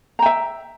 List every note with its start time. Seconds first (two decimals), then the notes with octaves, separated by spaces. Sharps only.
0.19 A#5
0.22 G5
0.26 E5